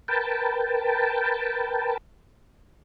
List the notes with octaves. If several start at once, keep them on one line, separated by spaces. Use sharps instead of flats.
A#4 B4 G5 A5